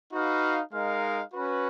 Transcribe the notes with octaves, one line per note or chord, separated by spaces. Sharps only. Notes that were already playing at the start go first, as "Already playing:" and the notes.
D#4 F#4 B4 F5
G#3 D#4 A#4 F5
C#4 F#4 B4